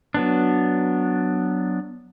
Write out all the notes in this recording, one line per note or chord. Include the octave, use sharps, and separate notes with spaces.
F#3 B3 D4